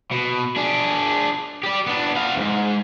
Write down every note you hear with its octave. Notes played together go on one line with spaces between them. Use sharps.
B2
D4 G#4
G4 D5
B3 D4
F#4 F5
E2 G#2